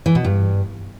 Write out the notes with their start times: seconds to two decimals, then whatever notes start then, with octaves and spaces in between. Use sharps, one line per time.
0.06 E3
0.15 B2
0.24 G2